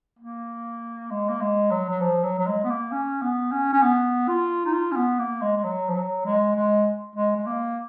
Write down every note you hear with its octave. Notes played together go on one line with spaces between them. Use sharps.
A#3
G#3
A#3
G#3
F#3
F#3
F3
F#3
F#3
G#3
B3
A#3
C#4
B3
C#4
C#4
B3
F4
D#4
F4
C#4
B3
A#3
G#3
G#3
F#3
F3
F#3
G#3
G#3
G#3
G#3
A#3